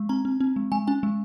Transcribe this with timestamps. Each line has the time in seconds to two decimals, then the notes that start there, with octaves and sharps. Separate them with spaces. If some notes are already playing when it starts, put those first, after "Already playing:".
Already playing: G#3
0.09 C4 A#5
0.25 C4
0.40 C4
0.56 G#3
0.72 G#3 G#5
0.87 C#4 G#5
1.03 G#3